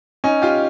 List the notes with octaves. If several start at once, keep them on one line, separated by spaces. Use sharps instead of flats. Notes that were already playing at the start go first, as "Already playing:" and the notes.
C#4 D#4
F4 G4